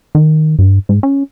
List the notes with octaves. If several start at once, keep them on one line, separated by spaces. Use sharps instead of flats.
D#3
G2
G#2
C#4